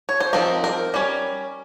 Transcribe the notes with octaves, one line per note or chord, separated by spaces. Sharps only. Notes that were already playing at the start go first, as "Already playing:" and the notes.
C#5
C5
F3 C4 D#4 A#4
A#4
G3 C#4